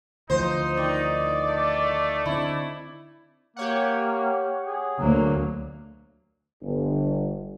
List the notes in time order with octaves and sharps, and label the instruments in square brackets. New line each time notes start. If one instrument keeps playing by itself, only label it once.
[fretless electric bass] D2 E3 F3 [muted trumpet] D#4 [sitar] C5
[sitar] D#3 [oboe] D5
[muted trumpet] A3
[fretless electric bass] D3 C4 [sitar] E4
[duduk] A#3 [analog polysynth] G4 C#5 F#5
[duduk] G#4
[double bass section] D2 A#3 [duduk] F#3
[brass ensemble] G1